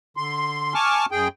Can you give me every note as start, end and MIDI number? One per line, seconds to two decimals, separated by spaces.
0.17 0.74 50
0.17 0.74 84
0.74 1.06 80
0.74 1.06 81
0.74 1.06 85
0.74 1.06 86
0.74 1.06 89
1.11 1.28 42
1.11 1.28 68
1.11 1.28 79